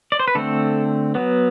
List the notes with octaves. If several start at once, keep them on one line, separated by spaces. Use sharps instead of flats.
D5
C5
B4
D3 A3 C4 A4
F#3 B3